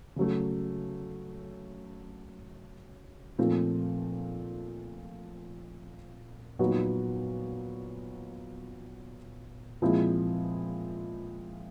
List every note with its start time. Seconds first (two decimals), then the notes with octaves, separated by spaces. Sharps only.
0.16 C#3 F#3 A3
3.38 A#2 F3 A3 C4
6.59 A#2 F#3 B3 D#4 F#4
9.82 A#2 F3 G#3 C4 E4